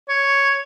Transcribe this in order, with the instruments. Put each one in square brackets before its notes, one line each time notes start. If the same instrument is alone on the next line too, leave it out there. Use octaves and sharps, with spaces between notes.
[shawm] C#5